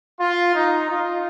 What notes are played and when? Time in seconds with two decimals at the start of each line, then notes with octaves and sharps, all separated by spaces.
0.20 F4
0.55 D#4
0.89 F4